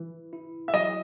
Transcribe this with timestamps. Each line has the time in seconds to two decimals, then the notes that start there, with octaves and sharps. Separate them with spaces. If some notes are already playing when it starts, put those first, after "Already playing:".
Already playing: E3
0.33 E4
0.68 E5
0.74 F#3 D#5